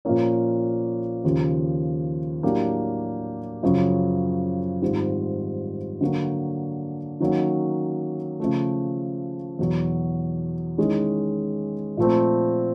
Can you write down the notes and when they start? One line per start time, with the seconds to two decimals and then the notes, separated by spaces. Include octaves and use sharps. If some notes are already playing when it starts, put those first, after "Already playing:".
0.05 A#2 F3 A#3 C#4
1.24 D#2 C#3 F3
2.43 A2 F#3 A#3 D4 G4
3.63 F#2 C#3 F3
4.82 G#2 D#3 G3 C4 F4
6.01 D3 F#3 A#3
7.20 D#3 F#3 A#3 C#4 F#4
8.40 C#3 F3 A3
9.59 E2 B2 F#3
10.78 D#3 G#3 C#4 E4
11.97 A#2 F3 A3 C4